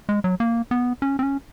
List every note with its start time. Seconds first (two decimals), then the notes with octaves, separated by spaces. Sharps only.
0.09 G#3
0.24 F#3
0.40 A#3
0.71 B3
1.02 C#4
1.19 C4
1.23 C#4